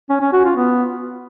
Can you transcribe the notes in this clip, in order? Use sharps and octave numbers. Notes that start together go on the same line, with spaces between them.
C#4
C#4
F#4
F4
B3